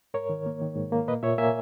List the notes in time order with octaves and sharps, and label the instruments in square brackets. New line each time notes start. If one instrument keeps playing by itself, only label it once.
[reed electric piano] G#2 A#4 C#5
D#3
A#3
D#3
G#2
A#3
A#2 B4 D#5
A#2 C#5 E5
A#3 E5 G#5